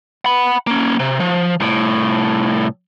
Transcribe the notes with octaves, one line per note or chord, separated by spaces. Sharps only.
F#5 B5
A#3 C#4
C3
F3
C2 A2